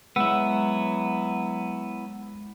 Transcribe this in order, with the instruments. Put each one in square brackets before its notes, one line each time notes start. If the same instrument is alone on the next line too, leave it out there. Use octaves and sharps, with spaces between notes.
[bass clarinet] F#3 [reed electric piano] G#3 F#5 E6 [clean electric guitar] B3 E4